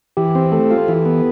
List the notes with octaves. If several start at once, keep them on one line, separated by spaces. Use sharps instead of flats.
E3 G4
C4
A3 A4
F4
E3
B3